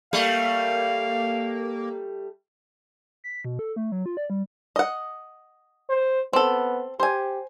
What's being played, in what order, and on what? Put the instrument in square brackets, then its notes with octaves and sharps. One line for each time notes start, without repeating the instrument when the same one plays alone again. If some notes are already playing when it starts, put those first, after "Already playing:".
[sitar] G3 A3 [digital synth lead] A#3 [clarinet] F5
[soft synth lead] B6
B2
A4
A3
F#3
F4
D5
G3
[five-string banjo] D#5 F#5
[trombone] C5
[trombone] B3 [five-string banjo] C4 A4
[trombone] G4 [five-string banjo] C5 G#5